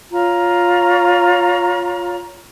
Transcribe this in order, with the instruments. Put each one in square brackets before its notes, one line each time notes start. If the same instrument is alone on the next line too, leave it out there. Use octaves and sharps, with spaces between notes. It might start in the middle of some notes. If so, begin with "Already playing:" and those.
[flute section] F4 C#5 A#5